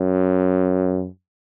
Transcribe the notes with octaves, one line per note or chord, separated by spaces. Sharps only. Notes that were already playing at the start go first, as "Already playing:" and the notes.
Already playing: F#2